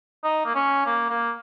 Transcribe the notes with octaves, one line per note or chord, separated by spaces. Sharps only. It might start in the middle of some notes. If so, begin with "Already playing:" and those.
D#4
A#3
C#4
A#3
A#3